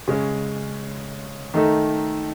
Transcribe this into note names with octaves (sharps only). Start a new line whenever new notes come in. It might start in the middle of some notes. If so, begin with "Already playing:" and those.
C#3 G#3 C#4
D#3 A3 D#4 A4